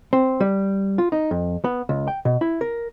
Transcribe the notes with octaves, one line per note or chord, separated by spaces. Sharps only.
C4
G3
F4
D#4
F2
B3
C#2
G5
B2
E4
A#4